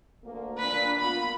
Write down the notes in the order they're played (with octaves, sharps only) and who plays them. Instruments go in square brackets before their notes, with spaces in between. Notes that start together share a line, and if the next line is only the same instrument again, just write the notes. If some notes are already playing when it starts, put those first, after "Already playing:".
[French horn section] D2 A#3
[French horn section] A#2 D4 [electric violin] B4 B6
[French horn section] A#3 B3 F4 [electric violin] B5